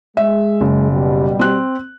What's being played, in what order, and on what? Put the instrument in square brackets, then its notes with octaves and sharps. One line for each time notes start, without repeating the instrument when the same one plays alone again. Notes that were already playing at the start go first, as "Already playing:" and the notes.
[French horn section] G#3 [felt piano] E5
[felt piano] F#1
[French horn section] B2 G3
[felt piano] C4 F#6